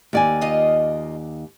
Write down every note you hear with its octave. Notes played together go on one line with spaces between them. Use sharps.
D#2 D5 G#5
D#4 F4 D#5